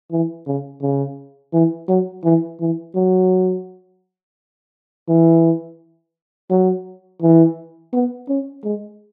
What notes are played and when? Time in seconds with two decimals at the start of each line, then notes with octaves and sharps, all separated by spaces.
0.12 E3
0.47 C#3
0.82 C#3
1.53 E3
1.89 F#3
2.24 E3
2.60 E3
2.95 F#3
5.08 E3
6.51 F#3
7.22 E3
7.93 B3
8.29 C#4
8.64 G#3